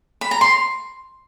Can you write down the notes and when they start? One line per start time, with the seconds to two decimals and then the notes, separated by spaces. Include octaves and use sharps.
0.21 B5
0.31 A#5
0.41 C6